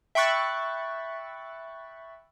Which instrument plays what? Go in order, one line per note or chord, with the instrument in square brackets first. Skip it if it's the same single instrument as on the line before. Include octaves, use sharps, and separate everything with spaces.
[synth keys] E5 G5 B5 C#6 F#6 A6